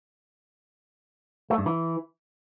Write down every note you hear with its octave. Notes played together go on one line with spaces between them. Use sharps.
A3
G2
E3